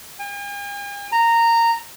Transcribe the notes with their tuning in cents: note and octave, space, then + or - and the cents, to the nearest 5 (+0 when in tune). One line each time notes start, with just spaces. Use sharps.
G#5 -45
A#5 -15